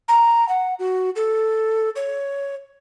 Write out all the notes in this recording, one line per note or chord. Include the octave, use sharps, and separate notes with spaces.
A#5
F#5
F#4
A4
C#5